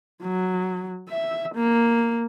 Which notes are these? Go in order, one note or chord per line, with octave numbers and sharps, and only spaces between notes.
F#3
E5
A#3